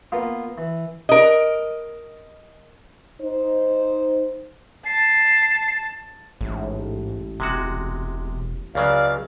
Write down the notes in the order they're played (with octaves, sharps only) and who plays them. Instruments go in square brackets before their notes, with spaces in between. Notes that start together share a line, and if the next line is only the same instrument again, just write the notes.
[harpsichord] A#3 B3 F4
E3
[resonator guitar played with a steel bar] A#4 D#5
[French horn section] D#4 C5
[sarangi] A5 [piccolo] C7
[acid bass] A1 [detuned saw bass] G#2
[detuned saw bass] E1 [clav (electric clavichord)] C3 G#3 F#4
[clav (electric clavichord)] C#2 C#3 F#3 [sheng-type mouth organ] D5 F5